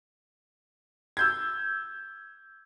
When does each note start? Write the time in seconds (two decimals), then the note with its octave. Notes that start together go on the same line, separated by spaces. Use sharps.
1.17 E6 G6 G#6